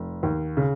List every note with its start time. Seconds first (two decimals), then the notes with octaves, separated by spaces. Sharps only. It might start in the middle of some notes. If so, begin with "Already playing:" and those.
Already playing: F1
0.23 D#2
0.57 C#3